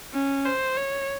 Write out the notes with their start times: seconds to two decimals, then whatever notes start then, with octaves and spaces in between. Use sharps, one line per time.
0.14 C#4
0.46 C5
0.77 C#5